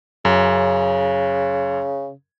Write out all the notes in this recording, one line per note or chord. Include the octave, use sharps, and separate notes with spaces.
F#2 C#3